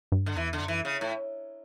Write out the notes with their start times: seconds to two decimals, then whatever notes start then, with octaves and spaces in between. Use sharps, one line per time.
0.12 G2
0.26 D3
0.36 E2 E3
0.53 D3
0.60 F#2
0.68 E3
0.85 C#3
1.01 A2